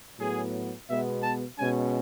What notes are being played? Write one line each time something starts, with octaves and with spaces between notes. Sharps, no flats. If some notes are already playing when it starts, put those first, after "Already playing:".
A2 F#3 B3 G#4
B2 G#3 B3 E5
A5
B2 G#3 C#4 G#5